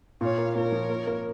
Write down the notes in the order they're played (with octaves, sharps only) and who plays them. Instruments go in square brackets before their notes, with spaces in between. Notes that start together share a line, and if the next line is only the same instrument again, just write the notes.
[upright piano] A#2 [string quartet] C#5 F5
[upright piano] A#3
[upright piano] A#2 [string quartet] A#4 C#5
[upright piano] F3
A#3
A#3